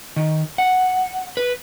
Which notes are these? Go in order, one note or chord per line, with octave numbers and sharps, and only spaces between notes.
D#3
F#5
B4